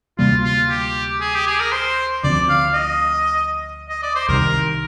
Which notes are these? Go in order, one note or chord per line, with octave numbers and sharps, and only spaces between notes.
D2 C3 G3 A#3 F4
F4
G4
G#4
G4
G#4
A#4
C5
D2 D3 F3 C4 D5
F5
D#5
D#5
D5
C5
C2 C3 D#3 A#4